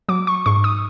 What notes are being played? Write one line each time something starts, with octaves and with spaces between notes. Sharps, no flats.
F#3 D6
C#6
G#2 C#6
D#6